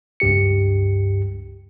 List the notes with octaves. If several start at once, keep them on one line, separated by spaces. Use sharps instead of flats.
C#2 G2 G4 C#7